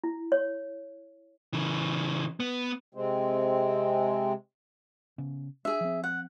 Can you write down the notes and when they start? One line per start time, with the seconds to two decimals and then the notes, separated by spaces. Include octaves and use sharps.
0.04 E4
0.32 C#5
1.53 C#3 E3
2.40 B3
2.95 C3 G#3 C4
5.18 C#3 B3 C#4
5.65 D4 G#4 E5
5.81 F3 C4
6.04 F#5